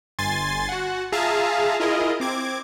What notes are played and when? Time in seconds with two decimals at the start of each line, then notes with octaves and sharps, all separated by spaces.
0.19 G1 G#5 C6 A6
0.69 F#4 F#5
1.12 F4 G#4 E5 F5 A5 A#5
1.80 E4 F4 G#4 A#4 D#5
2.20 C4 D6 G#6